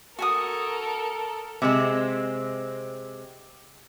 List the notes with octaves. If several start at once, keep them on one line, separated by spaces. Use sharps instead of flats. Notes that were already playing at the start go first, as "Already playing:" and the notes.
F#4 A4 A#4 G#5 D#6
C3 G#3 C4